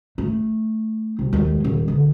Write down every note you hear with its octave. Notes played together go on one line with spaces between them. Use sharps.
A3
F1 C2
D#2 G#3
D#1
B1 D3